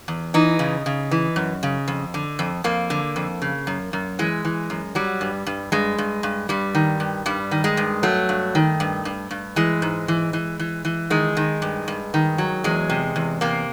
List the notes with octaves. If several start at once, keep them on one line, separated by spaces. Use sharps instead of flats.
E2
E3 D#4
C#3
C#3
E3
F#2
C#3
F2
D3
F2
F2 A#3
D3
F2
C#3
F#2
F#2
E3 G#3
E3
F#2
F#3 G3
G2
G2
G2 G#3
G2
G2
G2 G3
D#3
G2
G2 G3
D#3
G#3
G2
F#3 A3
G2
D#3
G2
G2
G2
E3 G#3
G#2
E3
E3
E3
E3
D#3 G#3
D#3
G2
G2
D#3
F#3
E2 G#3
C3
E2
C3 A#3